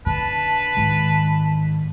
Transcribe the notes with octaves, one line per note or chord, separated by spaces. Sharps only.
D3 B4 A5
G#2 D#3